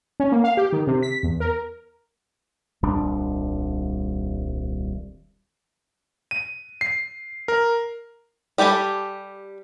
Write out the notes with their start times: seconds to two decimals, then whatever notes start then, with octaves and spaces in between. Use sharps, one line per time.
0.20 C#4
0.32 A#3
0.44 F5
0.57 G4
0.72 D#3
0.87 C3
1.03 B6
1.23 E2
1.40 A#4
2.83 D#1 C2 G3 D4
6.31 D#7
6.81 C7
7.48 A#4
8.58 G3 G4 A4 G#5 B5